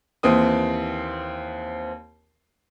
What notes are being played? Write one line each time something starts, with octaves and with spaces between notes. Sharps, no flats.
D#2 E3 C4 D#6